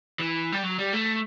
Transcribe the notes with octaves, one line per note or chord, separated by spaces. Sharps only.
E3
G3
F#3
G3
A3